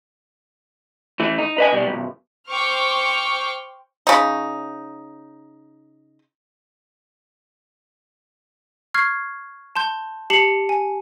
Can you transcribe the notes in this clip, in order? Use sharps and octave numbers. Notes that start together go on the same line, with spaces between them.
E3 A3
D#4
B4 D#5 G#5
B2 G3
B1 F#2
C5 G5 C#6 D6 F6
C#3 D#4
C#6 F6 G#6 C7
A5 C6 G6
G4 A5 C7 C#7 F#7
G#5